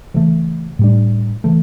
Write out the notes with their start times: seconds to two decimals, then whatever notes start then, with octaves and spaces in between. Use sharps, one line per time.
0.14 C#3 E3 A3
0.79 A2 G3 D4
1.44 C#3 E3 A3